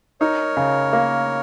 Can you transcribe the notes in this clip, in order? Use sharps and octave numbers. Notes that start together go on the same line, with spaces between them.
D#4 A#4 C#5
C#3
A#3